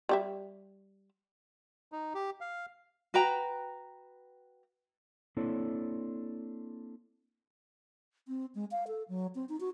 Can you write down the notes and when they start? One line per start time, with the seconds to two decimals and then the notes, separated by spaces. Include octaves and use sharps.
0.09 G3 G4 E5
1.92 D#4
2.15 G4
2.41 F5
3.14 F#4 B4 G5 A#5
5.37 A#3 C4 D4 E4 A4 C#5
8.28 C4
8.55 G#3
8.71 F5
8.87 A4
9.09 F#3
9.35 C4
9.49 D#4
9.60 F#4